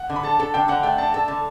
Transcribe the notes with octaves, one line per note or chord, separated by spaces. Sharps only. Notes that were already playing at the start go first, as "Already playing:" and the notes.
Already playing: F#5
D3
B5
A4 A5
A4
D3 G5
D3 F#5
A3 G5
D4 A5
A4 A5
D3